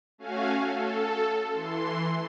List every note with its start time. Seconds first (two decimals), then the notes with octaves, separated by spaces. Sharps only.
0.18 A3 C#4 F#4 F5 G#5
0.60 A4
1.52 E3 C6